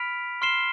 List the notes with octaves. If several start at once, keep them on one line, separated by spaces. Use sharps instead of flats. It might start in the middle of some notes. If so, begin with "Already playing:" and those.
Already playing: B5 F6 B6 D7 F7
C6 F6 C7 E7 G7